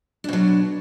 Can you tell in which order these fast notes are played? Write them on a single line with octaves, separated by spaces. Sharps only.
D4 B2 F#3